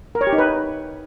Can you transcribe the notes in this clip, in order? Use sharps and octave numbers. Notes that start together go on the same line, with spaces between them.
A#4
C#5
G4
D#4
B4